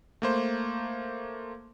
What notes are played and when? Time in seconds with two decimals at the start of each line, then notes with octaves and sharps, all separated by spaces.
0.22 A3 A#3 C5